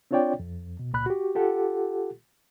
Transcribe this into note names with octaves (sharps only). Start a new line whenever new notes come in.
C4 D4 F4 C#5 D5 G5
F2
B2
C#2 A#2 B5 F#6
F#4 G4
F4 G4 A4 F#5